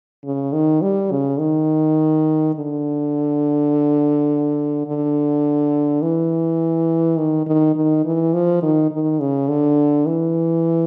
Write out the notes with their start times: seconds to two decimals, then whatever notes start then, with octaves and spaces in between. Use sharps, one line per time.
0.24 C#3
0.53 D#3
0.82 G3
1.11 C#3
1.39 D#3
2.55 D3
4.87 D3
6.02 E3
7.18 D#3
7.46 D#3
7.75 D#3
8.05 E3
8.34 F3
8.63 D#3
8.91 D#3
9.21 C#3
9.49 D3
10.06 E3